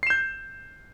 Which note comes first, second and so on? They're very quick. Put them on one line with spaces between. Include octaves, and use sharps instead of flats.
C7 E7 G6